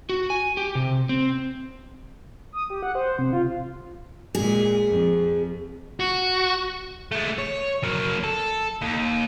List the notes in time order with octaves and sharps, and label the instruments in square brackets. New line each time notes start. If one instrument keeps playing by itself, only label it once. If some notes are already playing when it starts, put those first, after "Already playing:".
[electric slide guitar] F#4
G#5
G4
C3
C4
[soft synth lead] D#6
G4
F#5
C5
C3
F4
[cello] A#2 G#3 [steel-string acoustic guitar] G#4
[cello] F2
[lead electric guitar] F#4
[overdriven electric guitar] G#3 A3
C#5
F#3 A#3
A4
D#2